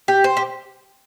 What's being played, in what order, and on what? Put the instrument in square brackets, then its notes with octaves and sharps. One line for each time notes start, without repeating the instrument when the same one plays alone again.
[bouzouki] G4
C5
G4